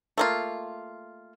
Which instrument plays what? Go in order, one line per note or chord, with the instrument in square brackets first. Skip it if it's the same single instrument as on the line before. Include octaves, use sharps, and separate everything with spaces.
[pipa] A3 A#3 F4